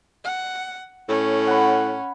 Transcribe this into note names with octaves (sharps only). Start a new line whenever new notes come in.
F#5
A2 C#4
F#5 B5